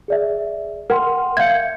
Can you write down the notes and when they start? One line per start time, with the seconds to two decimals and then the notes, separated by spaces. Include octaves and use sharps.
0.08 G#4 D5 E5
0.90 A#4 F#5 G5 C6
1.37 E5 F5 G6 G#6 C#7